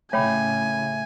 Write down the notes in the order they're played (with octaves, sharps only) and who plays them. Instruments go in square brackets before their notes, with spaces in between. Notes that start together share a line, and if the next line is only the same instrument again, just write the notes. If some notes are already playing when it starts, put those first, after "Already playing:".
[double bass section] A2 C#3 [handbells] A3 [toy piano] C#5 G5 B5 [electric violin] G#5